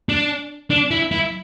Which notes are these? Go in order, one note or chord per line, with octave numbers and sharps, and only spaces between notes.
D4
D4
E4
E4